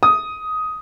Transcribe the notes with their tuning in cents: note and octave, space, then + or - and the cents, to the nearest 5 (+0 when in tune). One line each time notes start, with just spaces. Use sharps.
D#6 +10